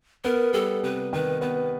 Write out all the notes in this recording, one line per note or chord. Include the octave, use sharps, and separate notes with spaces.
B3 A#4
G3 A4
C3 B4
D#3 B4
B3 B4